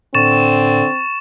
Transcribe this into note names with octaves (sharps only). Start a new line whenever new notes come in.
A2 D3 C4 C#6 A6 E7